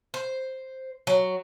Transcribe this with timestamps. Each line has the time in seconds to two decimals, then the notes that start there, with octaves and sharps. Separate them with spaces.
0.14 C5
1.07 F#3